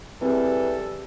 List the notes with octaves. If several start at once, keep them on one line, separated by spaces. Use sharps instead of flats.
E3 G3 C4 G#4 A4